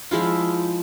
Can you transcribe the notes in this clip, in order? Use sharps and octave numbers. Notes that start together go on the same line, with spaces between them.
F3 G#3 E4 F4